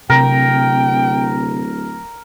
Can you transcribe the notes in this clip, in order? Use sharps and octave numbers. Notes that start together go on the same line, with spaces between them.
D1 C3 A#4 G5